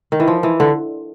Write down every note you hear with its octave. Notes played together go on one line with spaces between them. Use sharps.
D#3
E3
F3
E3
D3